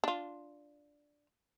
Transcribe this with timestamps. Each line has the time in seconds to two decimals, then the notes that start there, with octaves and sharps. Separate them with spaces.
0.04 D4 F4